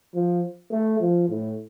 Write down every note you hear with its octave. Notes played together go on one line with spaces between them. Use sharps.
F3
A3
F3
A2